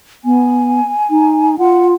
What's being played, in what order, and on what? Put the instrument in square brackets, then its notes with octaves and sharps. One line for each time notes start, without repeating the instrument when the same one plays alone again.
[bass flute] B3 [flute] G#5
[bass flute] D#4
[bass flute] F4 [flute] F#5